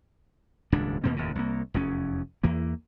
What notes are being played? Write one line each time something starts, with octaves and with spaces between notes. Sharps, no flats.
D#1 C#2 G#2 D4
D#2 B2 A#3 C4
F1 D#2 A2 C#3
C2 A#3
F1 E2 C#4
E2 E3 A#3